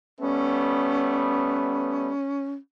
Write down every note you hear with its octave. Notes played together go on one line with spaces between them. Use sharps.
G3 A3 B3 C#4